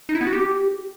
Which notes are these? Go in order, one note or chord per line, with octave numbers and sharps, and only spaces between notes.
D#4
E4
B3
F#4
G4